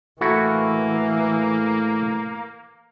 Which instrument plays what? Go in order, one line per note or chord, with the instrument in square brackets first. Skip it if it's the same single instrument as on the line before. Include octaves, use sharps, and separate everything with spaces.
[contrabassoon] A2 [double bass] E3 [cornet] A#3 [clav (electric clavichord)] E4 F#4 A4